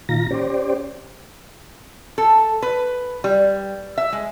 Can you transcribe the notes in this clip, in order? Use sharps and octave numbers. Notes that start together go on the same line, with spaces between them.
A#2 D#3 F4 A#5 A#6
C#4 G4 C5 D5
A4
B4
G3
E5
G#3